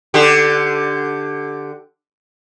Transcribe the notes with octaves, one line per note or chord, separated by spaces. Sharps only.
D3 G4